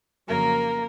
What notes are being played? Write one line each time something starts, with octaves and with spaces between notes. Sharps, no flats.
F2 C#3 F#3 A#3 A#4